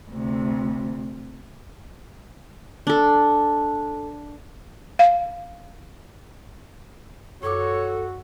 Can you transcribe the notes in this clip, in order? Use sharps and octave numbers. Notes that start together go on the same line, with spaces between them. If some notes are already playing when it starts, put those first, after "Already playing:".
D2 C3
D4 A4
F5
F#2 F#4 A4 C#5 D6